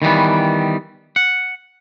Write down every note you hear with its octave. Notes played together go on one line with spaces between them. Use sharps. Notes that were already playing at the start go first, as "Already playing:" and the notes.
D#3 E3 G3 B3
F#5